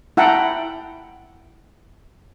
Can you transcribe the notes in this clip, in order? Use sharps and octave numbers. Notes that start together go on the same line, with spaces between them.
E4 F#5 G5 A5 A#5